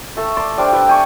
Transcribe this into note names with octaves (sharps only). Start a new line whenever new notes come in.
A3 A4
D5 A5 C6
G3 D4 C5 D6
G4 B4 E5 G5
G5 G#5 C#6